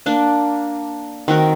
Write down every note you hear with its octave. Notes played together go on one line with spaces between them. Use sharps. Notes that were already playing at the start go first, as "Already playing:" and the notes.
A#3 D4
D#3 C4 F#4 A#4